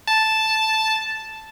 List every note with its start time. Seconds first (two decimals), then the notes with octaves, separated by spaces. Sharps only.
0.08 A5